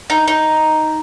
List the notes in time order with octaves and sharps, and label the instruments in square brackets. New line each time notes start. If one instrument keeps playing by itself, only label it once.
[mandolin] D#4
D#4